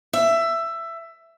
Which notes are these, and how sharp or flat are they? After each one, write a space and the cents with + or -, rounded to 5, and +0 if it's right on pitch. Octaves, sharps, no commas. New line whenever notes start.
E5 +15